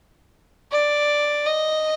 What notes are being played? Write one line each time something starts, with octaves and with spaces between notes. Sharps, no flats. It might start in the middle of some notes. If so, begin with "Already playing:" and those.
D5
D#5